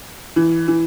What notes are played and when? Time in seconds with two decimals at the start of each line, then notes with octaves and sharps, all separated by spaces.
0.36 E3
0.68 E3